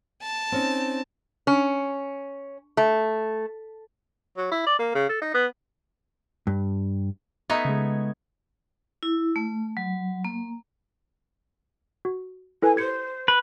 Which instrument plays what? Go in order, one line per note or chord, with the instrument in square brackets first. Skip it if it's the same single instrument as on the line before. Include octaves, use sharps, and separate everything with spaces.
[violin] A5
[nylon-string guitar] C4 C#4 D#4
[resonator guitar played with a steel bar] C#4
A3
[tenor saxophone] F#3
E4
D5
A#3
C#3
A4
D#4
B3
[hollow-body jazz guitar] G2
[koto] A3 B3 D#4 [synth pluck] G#6
[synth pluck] C#3 G#3
[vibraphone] E4
A3
F#3
A#3
[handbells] F#4
[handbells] E4 A4 B4 [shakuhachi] G#5
[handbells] G4 G#6 C#7 [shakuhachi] C5
[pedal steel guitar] B4